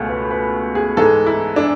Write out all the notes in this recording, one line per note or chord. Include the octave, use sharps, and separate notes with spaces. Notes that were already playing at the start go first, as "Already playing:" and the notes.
Already playing: C#2 B2 A3 G#4 A4
B4
B4
G#4
G#2 E3 G#3 A4
E4
D4